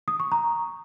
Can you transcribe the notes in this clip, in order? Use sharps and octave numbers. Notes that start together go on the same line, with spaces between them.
D#6
C#6
A#5